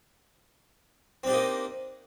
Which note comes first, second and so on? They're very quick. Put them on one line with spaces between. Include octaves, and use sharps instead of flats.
C4 D4 G4 D#4 A#3